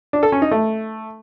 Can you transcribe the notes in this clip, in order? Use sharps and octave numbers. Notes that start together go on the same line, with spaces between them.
D4
A4
C#4
D#4
A3